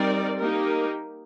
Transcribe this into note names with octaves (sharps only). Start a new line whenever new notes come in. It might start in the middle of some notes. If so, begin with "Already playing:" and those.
Already playing: G3 C4 D#4 A#4 D5
A#3 D#4 G4 A#4